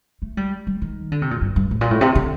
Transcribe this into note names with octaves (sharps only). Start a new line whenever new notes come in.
A3
G3
G3
D#3
D3
C3
A#2
G2
G2
A2
A#2
A2
C3
D3